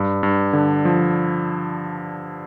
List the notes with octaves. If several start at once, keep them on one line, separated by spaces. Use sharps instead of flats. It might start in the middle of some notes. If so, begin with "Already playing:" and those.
Already playing: G2
G2
D3
F3